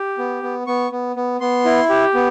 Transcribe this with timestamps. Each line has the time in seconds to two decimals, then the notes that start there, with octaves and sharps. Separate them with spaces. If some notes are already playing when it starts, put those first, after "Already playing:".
Already playing: G4
0.18 B3
0.43 B3
0.67 B3 C#6
0.92 B3
1.16 B3
1.40 B3 C6
1.65 E4
1.90 G4
2.14 B3